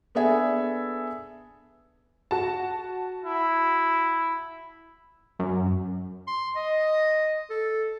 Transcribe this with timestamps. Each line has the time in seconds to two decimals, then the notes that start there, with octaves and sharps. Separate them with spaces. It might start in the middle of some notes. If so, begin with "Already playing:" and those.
0.15 B3 D4 G#4 A4 E5 G#5
2.31 F#4 A5
3.25 E4
5.39 F#2
6.28 C6
6.56 D#5
7.50 A4